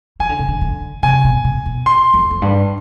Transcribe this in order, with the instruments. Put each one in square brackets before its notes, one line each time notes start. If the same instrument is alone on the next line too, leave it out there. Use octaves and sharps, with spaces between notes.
[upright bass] D#3 [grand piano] G#5
[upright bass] D3
C3
D3
D3
[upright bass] C3 [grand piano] G#5
[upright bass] B2
B2
B2
[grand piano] C6
[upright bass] F2
F2
G2